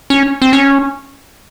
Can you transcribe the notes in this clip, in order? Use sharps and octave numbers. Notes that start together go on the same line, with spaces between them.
C#4
C4
C#4